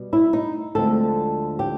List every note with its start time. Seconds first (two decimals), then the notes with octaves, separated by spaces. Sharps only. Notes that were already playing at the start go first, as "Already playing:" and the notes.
Already playing: B2 G3
0.13 E4
0.33 D#4
0.75 D2 D3 F3 G#3 C4 A4
1.59 G4